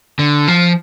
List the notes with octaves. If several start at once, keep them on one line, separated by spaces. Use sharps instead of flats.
D3
F3